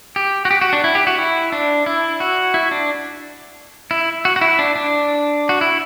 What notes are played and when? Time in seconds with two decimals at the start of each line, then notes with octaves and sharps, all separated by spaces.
0.16 G4
0.45 F#4
0.51 G4
0.61 F#4
0.73 D4
0.84 E4
0.95 G4
1.07 F#4
1.18 E4
1.52 D4
1.86 E4
2.20 F#4
2.54 E4
2.71 D4
3.91 E4
4.25 F#4
4.36 F#4
4.41 E4
4.59 D4
4.76 D4
5.49 F#4
5.61 E4